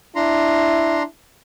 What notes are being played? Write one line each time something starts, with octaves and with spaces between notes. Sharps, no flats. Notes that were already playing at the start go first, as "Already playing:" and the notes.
D4 E4 A#5 C6